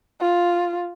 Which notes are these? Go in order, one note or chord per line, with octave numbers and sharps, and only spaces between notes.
F4